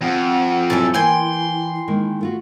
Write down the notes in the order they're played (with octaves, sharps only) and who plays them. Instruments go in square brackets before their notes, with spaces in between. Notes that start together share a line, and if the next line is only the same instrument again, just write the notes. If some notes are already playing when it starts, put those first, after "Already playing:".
[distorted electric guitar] F2 [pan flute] F#5
[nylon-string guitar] C3 E3 F#3 [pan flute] E4 [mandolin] A4 E5 G#5
[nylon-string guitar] E3 A#3 [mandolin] G5 G#5 [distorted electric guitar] C6
[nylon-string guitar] D#3 G#3 A#3
A3 F4 F#4